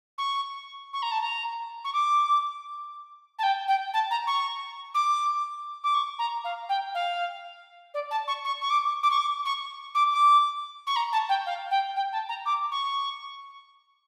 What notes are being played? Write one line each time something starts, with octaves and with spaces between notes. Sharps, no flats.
C#6
C#6
A#5
A5
A#5
C#6
D6
A5
G5
G5
A5
A#5
C#6
D6
D6
C#6
A#5
F5
G5
F5
D5
A5
C#6
C#6
C#6
D6
D6
C#6
D6
C#6
D6
D6
C#6
A#5
A5
G5
F5
G5
G5
A5
A#5
D6
C#6